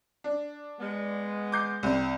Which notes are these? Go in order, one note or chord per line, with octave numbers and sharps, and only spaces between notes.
D4
G#3 B3
D6 G6 C7
C2 C4